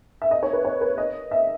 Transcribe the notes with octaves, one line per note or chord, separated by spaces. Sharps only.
E5
D#5
C#5
B4
C#5
B4
D#5
E5